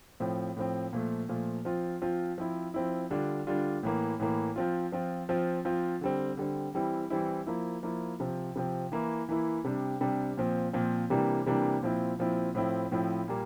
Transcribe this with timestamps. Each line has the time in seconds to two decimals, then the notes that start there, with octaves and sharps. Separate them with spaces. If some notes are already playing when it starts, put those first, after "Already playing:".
0.20 A2 F3 C4
0.56 A2 F3 C4
0.93 A#2 F3 A3
1.29 A#2 F3 A3
1.65 F3 C4 F4
2.02 F3 C4 F4
2.38 F3 C4 E4
2.74 F3 C4 E4
3.10 D3 G3 D4 F4
3.47 D3 G3 D4 F4
3.83 A2 E3 A#3
4.20 A2 E3 A#3
4.56 F3 C4 F4
4.92 F3 C4 F4
5.29 F3 C4 F4
5.65 F3 C4 F4
6.01 D3 G3 C4
6.37 D3 G3 C4
6.74 E3 G3 C4 E4
7.10 E3 G3 C4 E4
7.47 F3 A#3 E4
7.83 F3 A#3 E4
8.20 C3 F3 C4
8.56 C3 F3 C4
8.92 E3 A#3 E4
9.29 E3 A#3 E4
9.64 C3 G3 D4
10.01 C3 G3 D4
10.37 A#2 F3 C4
10.73 A#2 F3 C4
11.10 C3 E3 G3 A#3 D4
11.46 C3 E3 G3 A#3 D4
11.82 A#2 F3 C4 E4
12.19 A#2 F3 C4 E4
12.55 A2 F3 C4 E4
12.92 A2 F3 C4 E4
13.28 A#2 G3 A#3